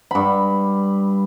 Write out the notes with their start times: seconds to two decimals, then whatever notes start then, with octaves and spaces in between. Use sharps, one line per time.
0.11 G2 B5